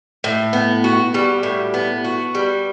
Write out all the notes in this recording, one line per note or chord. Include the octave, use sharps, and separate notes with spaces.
A2
B3
F#4
G3
A2
B3
F#4
G3